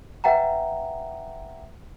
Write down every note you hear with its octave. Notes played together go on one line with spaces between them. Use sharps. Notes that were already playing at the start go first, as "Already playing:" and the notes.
B4 E5 F#5 G5 A#5